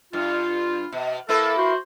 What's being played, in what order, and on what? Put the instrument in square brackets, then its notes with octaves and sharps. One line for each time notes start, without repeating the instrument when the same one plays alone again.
[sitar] G2 [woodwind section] F4
[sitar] B2
[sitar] A#3 E4 B4 [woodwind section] A4
[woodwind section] F#4 C5